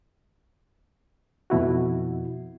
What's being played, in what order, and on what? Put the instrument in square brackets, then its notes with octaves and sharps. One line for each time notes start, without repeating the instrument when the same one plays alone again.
[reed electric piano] F2 B2 E4 F#4